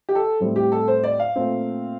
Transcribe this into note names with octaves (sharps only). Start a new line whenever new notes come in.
G4
A4
A2 G3 C4
G4
A4
C5
D5
F5
A#2 A3 C4